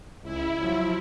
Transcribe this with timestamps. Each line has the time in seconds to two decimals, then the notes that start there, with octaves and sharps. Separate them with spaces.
0.23 C#2 E4
0.60 F3 F#3